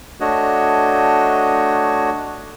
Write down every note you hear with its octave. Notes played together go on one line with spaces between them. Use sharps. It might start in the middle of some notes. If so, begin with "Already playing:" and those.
A3 D4 F#4 C#5 D#5